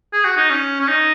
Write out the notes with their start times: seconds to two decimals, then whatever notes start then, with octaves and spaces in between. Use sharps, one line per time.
0.13 G#4
0.25 F#4
0.37 D#4
0.50 C#4
0.80 C#4
0.88 D#4